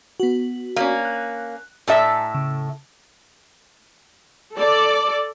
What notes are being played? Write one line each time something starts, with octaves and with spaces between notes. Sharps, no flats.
B3 F#4
A#3 C#4
F#6
A2 A4 E5 G#5 A#5
C#3
A4 D5